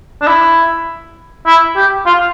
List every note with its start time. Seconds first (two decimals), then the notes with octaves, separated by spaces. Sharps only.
0.21 D4
0.27 E4
1.46 E4
1.76 G4
2.06 F4